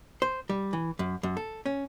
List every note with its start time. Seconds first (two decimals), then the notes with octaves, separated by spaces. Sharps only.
0.22 C5
0.50 G3
0.73 E3
0.99 F#2
1.23 F#2
1.37 A4
1.66 C#4